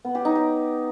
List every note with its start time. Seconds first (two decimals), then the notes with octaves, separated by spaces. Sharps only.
0.05 B3
0.15 G4
0.25 D#4
0.35 G4